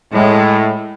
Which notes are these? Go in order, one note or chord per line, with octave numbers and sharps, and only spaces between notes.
A2 G#3